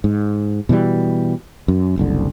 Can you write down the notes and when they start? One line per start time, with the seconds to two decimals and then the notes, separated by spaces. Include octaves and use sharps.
0.04 G#2
0.69 B2 E3 F#3 G3
1.68 F#2
1.97 F#1 C2 D3